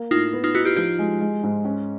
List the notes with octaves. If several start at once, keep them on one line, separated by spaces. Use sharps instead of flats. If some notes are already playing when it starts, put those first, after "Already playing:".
Already playing: A#3
A2 D#4 F4
B3
D#4 F4
D#4 E4 F#4
F4 G4
F3 F4 G4
G#3
G#3
G#2
C#4